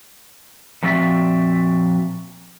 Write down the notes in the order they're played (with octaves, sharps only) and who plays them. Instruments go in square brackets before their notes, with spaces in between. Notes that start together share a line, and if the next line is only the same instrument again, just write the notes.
[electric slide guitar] A#2 F3 C4 F#4 D5 E5